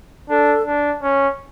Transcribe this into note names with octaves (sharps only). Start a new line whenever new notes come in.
D4 A4
D4
C#4